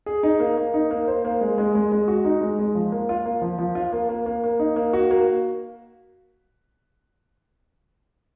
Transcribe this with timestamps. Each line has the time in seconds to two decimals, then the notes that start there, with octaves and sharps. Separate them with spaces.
0.06 G#4
0.23 D#4
0.40 A#3
0.57 A#3
0.74 D#4
0.91 A#3
1.08 C5
1.25 A#3
1.41 G#3
1.58 G#3
1.75 G#3
1.92 G#3
2.08 F#4
2.25 D#4
2.41 G#3
2.59 G#3
2.75 F3
2.92 A#3
3.09 F4
3.26 A#3
3.42 F3
3.58 F3
3.75 F4
3.93 A#3
4.09 A#3
4.26 A#3
4.44 A#3
4.60 D#4
4.76 A#3
4.93 F#4
5.11 A#3